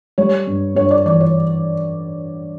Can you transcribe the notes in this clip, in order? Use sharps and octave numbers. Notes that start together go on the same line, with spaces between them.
G3 C#5
G2
G2 C#5
D5
E3 D5
C#5